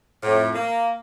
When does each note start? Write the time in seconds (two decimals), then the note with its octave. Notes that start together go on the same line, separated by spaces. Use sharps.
0.23 F2 A2
0.54 A#3